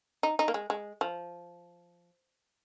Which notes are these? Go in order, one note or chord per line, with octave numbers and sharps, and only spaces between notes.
D#4
D#4
A#3
G#3
G#3
F3